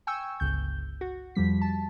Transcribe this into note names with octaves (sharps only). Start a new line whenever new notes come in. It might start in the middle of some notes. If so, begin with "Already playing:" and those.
G5 G#5 C#6 E6
G1 C#2 G6
F#4
F2 F3 G3 B6
A5